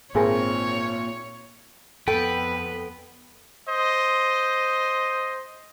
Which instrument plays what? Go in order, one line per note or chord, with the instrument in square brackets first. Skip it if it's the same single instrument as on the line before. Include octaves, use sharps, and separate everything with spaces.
[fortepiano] G#1 C4 [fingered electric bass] A#2 [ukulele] G#4 A#4 [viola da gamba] C#5
[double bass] F2 B3 [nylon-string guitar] A4 [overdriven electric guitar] B4 [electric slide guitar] G5
[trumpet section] C5 D#5